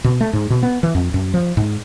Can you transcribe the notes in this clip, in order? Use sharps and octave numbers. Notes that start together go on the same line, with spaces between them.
B2
A3
G#2
B2
B3
E3
F2
F#2
F3
G#2